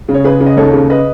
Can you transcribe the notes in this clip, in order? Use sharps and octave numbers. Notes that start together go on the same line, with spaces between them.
C#3
C#5
C#3 G#4 B4
C#3
D#5
D#2 A4 C#5
C#3
B4 D#5